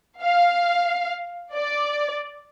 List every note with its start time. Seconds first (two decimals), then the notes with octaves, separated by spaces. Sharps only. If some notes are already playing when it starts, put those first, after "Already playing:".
0.22 F5
1.54 D5